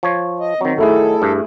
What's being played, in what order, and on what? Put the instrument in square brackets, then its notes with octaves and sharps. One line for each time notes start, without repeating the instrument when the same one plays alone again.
[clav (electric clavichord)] F3 C#5
[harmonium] D#5
[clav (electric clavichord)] D#3 F#3 [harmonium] C4
[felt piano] A3 E4 G#4 [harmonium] A4
[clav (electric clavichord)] G2